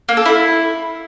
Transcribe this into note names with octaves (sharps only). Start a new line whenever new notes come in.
A#3
A4
E4